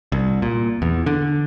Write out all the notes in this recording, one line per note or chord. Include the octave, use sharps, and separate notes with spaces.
C2
A#2
E2
D3